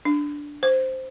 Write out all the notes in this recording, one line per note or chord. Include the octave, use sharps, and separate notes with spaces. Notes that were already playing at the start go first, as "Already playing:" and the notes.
D4
C5